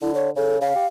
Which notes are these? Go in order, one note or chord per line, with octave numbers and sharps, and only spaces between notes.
D3 E4
C#5
C#3 A4
C#3 F5
G4